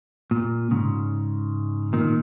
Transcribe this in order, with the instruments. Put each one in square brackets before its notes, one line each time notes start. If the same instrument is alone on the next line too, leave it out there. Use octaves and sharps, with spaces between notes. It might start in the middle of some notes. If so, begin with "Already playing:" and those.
[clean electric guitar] A#2
G#2 C#3
A#2 D#3